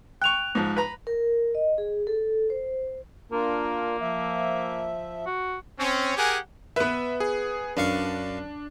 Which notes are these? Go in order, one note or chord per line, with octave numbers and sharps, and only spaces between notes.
G5 C#6 F#6 F7
G#2 F3
B4 A#5
A#4
D#5
G#4
A4
C5
A#3 D4 F4 A#4
F3 E5
F#4
C4 C#4
G4 G#4 A#4 F#5 G#5
B3 B4 E5
G#4
F#2 D4 F5 C#6